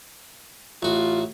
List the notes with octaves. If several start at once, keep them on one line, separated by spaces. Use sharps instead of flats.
A1 F4 F#4